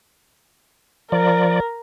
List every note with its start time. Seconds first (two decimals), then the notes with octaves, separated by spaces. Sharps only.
1.12 F3 A#4 D5